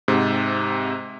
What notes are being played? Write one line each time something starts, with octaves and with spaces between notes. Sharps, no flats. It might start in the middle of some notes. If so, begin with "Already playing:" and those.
G#2 C3